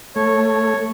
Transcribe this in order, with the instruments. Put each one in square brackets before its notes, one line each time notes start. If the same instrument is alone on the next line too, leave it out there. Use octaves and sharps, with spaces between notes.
[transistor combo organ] A3 [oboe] C#5